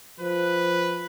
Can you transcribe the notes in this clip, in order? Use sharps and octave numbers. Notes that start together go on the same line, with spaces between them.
F3 B4